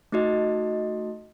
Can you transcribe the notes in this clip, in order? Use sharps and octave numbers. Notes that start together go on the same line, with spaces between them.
A3 D#4 F#4 D#5